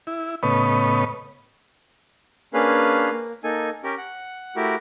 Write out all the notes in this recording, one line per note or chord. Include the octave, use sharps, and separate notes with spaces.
E4
A2 C#3 B3 B4 C#5 D#5
A#3 C#4 D4 G#4 B4 F5
A#3
A#3 D#4 A4 G#5
C#4 G4 A#4
F#5
A3 E4 F#4 G4 A#4